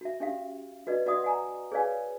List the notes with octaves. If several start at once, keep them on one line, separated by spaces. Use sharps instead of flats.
F#4 E5
C#4 G4 E5 F5
F#4 B4 D5 D#5
F#4 D5 E5 F#5 C6 D#6
F#5 G#5 A#5
G#4 B4 C#5 D5 F5 G#5